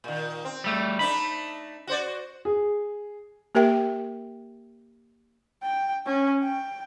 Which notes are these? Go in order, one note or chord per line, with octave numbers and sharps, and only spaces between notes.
A#2 D#3
C4
G3 A3
A3 D4 D#4 B5
F#4 C5 D5
G#4
A#3 G4 A#4 E5 G5
G5
C#4
G5